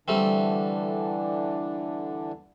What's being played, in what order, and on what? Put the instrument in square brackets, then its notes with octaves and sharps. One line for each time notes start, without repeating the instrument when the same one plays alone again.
[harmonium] D3 E3 D4 [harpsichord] G3 A3 C4